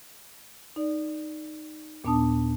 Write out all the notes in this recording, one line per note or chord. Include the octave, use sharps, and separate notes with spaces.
D#4 D5
D#2 A#2 B3 D4 A5 D#6